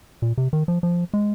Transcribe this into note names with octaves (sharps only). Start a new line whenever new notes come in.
A#2
C3
D#3
F3
F3
G#3